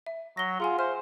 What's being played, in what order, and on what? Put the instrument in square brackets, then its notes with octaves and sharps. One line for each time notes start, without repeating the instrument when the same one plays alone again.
[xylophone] E5
[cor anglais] F#3 [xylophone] A#6 G7
[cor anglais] F4 [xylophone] G#4 F#5 G#5
[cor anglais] C5 [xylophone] E5 G#5 F6